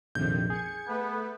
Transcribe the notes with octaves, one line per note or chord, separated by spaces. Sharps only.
A#1 F2 C3 D#3 G6
G#4 G#6 C#7
A3 B3 B4